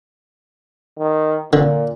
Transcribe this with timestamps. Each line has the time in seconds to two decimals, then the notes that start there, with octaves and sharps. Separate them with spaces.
0.99 D#3
1.53 A#2 D3